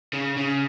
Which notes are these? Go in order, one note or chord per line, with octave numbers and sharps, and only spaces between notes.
C#3
C#3